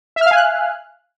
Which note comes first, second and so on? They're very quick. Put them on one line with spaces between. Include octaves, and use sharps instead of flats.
E5 F6 F5 G#5 F#6